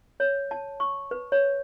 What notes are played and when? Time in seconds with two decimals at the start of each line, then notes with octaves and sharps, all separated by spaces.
0.20 C#5
0.51 A5
0.80 C#6
1.11 B4
1.32 C#5